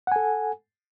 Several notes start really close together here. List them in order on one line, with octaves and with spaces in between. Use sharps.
F#5 G#5 A4